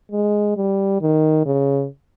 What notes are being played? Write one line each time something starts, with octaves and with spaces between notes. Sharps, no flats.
G#3
G3
D#3
C#3